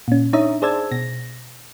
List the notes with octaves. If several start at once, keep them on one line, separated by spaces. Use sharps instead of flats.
A#2 C#4
D4 D#4 C#5 E5 A#5 D#6
G#4 C5 D5 A5 E6 G#6
B2 A#6